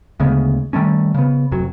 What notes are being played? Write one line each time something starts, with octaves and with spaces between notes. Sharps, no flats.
D2 C#3 G#3 B3
D#3 G3 A3 C#4
C#3 B3
F1 F2 F#3